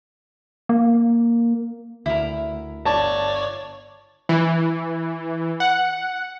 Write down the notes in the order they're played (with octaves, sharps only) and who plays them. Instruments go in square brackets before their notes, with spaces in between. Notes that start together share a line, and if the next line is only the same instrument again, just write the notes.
[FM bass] A#3
[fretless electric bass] D2 [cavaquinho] E4 A#4
[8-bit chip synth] G1 C#5 D5 [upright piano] A5
[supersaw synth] E3
F#5